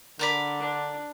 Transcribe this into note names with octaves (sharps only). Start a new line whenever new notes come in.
D3 A#4 D5 B5
D4